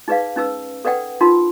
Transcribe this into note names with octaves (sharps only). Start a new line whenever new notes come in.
D#4 G#4 B4 D5 F5
C#4 D#4 B4 E6
A4 B4 D5 F#5 G5
D4 D#4 F4 A#4 C6